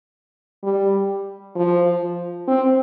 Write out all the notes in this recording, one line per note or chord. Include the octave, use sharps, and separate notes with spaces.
G3
F3
C4